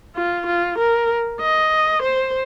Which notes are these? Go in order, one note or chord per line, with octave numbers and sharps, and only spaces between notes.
F4
F4
A#4
D#5
C5